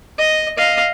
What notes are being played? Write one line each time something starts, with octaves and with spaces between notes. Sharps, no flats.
D#5
D#5 F5